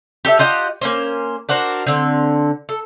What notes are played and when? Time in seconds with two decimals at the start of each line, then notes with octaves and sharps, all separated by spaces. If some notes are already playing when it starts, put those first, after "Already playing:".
0.25 G4 A4 D5 E5
0.39 F4 G4 D#5 F#5
0.81 A#3 C#4 C5
1.49 D4 F#4 A#4 C5
1.87 D3 C4
2.69 A4